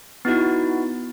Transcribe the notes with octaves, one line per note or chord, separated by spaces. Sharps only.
B3 D#4 E4 F#4